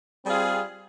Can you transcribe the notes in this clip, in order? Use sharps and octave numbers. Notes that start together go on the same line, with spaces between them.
G3 C4 F4 G#4